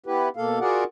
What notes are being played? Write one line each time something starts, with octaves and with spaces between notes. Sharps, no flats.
B3 E4 G4 B4
B2 A#3 A4 F5
F4 F#4 G#4 A#4 D5 F#5